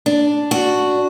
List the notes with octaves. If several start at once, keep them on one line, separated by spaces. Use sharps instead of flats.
D4
F#4